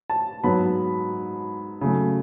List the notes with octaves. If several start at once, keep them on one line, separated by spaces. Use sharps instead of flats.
A5
G#2 F#3 B3 B5
C#3 F#3 A3